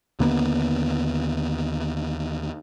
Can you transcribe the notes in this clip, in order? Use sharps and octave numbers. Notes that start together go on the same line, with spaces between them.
D#2 D3 A#3 B3